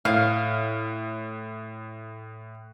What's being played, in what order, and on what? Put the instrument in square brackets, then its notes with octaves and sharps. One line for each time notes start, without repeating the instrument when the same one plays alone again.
[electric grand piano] A2 [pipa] F5